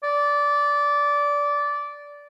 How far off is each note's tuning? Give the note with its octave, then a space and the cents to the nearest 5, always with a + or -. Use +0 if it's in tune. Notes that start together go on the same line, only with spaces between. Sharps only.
D5 -15